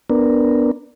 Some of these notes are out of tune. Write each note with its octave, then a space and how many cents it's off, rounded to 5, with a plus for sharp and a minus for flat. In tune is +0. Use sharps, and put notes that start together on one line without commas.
B3 +0 D4 +0 A#4 +0